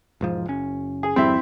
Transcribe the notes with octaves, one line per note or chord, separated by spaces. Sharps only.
E1 G#2 F3
F#1 C#4
G#4
G#1 F2 G3 C4 E4 E5